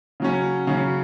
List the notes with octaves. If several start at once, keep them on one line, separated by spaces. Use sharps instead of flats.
C#3 F#3 C#4
C#3 F#3 C#4